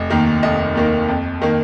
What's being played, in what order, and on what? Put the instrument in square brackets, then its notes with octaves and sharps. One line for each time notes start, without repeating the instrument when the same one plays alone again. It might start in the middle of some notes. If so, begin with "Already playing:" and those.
Already playing: [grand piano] F1 D#5
D#2 D#3 A#3
F1 D#5
D#2 D#3 A#3
F2
D#3 A#3